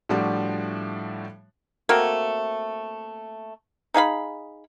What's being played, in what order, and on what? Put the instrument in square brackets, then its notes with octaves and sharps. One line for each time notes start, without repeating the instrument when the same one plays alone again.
[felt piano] A2 F3 G3 D4 F#4
[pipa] A3 A#3 C4 F#4
D#4 G#4 F5 B5